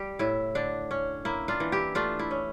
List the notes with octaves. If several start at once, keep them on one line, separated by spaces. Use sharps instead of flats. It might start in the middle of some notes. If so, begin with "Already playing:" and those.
Already playing: G3 G4
A2 E4
D3 D4
C#4
A#3 E4
D4 F4
E3
E4 G4
A3 D4 F4
E4
C#4